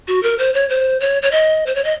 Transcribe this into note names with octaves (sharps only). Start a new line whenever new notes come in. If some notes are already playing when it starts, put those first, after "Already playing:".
F#4
A#4
C5
C#5
C5
C#5
C#5
D#5
C5
C#5
D#5